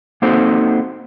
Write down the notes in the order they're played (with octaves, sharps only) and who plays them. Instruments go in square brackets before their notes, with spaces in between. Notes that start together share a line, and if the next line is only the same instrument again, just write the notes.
[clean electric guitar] A#3 C4 D#4 F#4 A4 C5